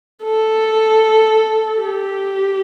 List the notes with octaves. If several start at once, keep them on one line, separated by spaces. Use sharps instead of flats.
A4
G4